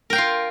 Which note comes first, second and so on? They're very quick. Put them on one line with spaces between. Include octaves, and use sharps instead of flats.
A#4 G5 F5 F4